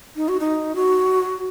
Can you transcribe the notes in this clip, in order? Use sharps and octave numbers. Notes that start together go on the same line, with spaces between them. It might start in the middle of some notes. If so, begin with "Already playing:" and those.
D#4
F#4
D#4
F#4